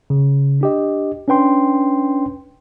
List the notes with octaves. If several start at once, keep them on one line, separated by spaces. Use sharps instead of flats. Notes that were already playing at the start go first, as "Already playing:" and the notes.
C#3
D4 G4 D#5
C#4 D4 B4 G5 C6